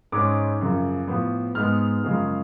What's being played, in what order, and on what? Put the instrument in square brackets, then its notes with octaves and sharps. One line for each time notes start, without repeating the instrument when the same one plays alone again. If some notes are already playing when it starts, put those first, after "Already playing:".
[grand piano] G#2 G#3 C#4 D6
F#2 C#3 F3
A2 F3 B3
G#2 G#3 B3 F6
F#2 C#3 F3 G#3